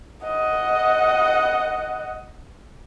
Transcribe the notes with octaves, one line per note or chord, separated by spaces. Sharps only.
D#5 F#5